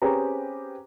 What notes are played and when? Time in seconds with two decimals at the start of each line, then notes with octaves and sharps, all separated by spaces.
0.02 C4 C#4 G4 G#4 B4 A#5